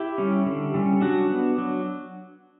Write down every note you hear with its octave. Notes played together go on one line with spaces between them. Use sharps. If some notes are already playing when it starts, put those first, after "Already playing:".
Already playing: E4 G4
G3 C#4
D3
G3 C#4
F#3 D4 F#4
B3
F#3